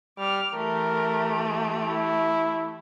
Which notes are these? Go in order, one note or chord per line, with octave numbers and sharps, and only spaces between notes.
G3 D6 F6
E3 A3 G4 A#4
E4